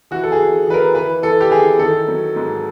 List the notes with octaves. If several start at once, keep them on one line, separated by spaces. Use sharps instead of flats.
E3 F#4
A4
G#4
E3
E3 B4
A#4
E3 B4
E3 A4
G4
E3 G#4
D#3 A4
F#3
G#2